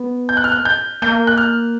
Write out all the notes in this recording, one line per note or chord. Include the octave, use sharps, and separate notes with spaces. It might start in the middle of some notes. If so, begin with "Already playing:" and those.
Already playing: B3
G6
F#6
F6
F#6
G6
A#3 G6
F#6
F6